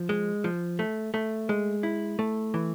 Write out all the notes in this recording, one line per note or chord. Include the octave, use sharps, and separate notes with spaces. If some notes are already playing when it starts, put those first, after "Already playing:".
Already playing: F3
G#3
F3
A3
A3
G#3
E4
A3
E3